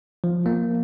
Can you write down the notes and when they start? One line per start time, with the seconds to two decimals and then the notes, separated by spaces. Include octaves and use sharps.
0.24 F3
0.46 A#3